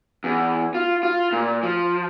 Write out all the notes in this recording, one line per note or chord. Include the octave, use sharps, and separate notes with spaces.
E2
F4
F4
A#2
F3